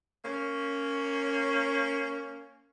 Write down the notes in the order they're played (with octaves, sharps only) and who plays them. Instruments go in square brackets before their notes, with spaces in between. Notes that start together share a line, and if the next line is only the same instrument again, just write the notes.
[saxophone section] A#3 C#4